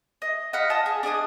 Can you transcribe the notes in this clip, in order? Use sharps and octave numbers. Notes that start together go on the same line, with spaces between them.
D#5
D#5 F5 F#5 B5
F4 D#5 A5 D#6
G#4
D4 G#4 D#5 D#6